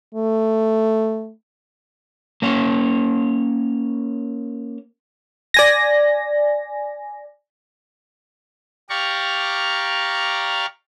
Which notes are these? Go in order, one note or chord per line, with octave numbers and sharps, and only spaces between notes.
A3
A#3 C#4 C#5
D5 G#5 A#6
G4 D5 F5 A#5 C#6